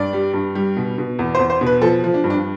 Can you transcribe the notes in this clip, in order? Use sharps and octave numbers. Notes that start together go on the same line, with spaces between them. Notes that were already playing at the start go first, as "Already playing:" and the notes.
Already playing: G2 D5
G3
G2
G3
B2
B2
E2
C5
E2
C5
B2
B4
F3 A4
F3
D4
G2
D4